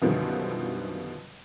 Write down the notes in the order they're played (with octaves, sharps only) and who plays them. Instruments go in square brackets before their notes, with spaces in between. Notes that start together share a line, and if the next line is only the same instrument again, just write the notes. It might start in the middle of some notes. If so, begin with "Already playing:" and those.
[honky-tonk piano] F#2 B2 D3 D#3 F3 G3